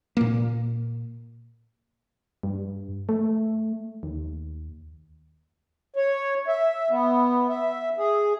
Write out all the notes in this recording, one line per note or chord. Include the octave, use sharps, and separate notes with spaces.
A#2 A#3
G2
A3
D#2
C#5
E5
B3
E5
G#4